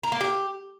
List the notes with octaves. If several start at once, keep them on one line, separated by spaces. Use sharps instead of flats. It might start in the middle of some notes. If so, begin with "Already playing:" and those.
A#4
A#3
G4